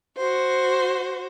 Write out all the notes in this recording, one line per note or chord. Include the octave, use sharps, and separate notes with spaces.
F#4 C5